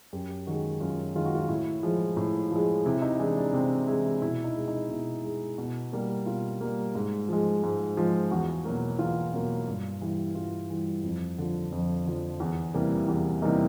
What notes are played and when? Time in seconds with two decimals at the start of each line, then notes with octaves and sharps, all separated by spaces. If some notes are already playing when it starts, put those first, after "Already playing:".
0.13 F#2 G4
0.47 D#3 G#3 F#4
0.81 F#2 F4
1.15 D#3 G#3 F4
1.26 F#4
1.35 F4
1.49 A2 E4
1.83 F3 G#3
2.17 A2
2.51 F3 G#3
2.85 C3 E4
3.02 D#4
3.19 E3 G#3 D4
3.37 D4
3.53 C3 C4
3.87 E3 G#3 E4
4.22 B2 E4
4.44 D#4
4.56 G#3
4.68 D#4
4.90 B2 E4
5.24 G#3
5.58 B2
5.93 G3 A#3
6.26 B2 F4
6.61 G3 A#3
6.95 G#2
7.29 F3 G#3
7.63 G#2
7.97 F3 G#3
8.31 E2 F#4
8.65 B2 F#3 A#3
8.99 E2 F4
9.33 B2 F#3 A#3
9.68 G2
10.01 E3 G3
10.35 G2 F4
10.70 E3 G3
11.03 F2
11.38 D3 F3
11.72 F2
12.07 D3 F3
12.40 E2
12.74 C3 E3 G3 A#3
13.08 E2
13.42 C3 E3 G3 A#3 D#4